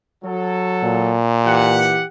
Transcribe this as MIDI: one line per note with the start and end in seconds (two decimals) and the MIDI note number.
0.24 1.19 54
0.24 1.19 69
0.84 2.05 46
1.46 2.04 52
1.46 2.04 67
1.46 2.04 78